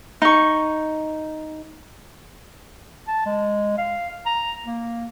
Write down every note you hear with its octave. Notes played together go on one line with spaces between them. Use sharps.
D#4 C#6
A5
G#3
F5
A#5
A#3